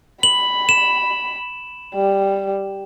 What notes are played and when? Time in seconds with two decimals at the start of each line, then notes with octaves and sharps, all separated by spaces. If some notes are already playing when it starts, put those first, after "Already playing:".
0.23 B5 F#7
0.69 E7
1.95 G3